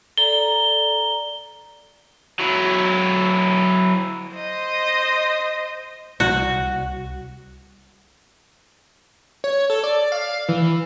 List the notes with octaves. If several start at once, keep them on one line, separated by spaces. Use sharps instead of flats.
A4 D5 A#5 G7
F#3 E4
C5 D#5
C2 F#4
C#5
A4
D5
F5
E3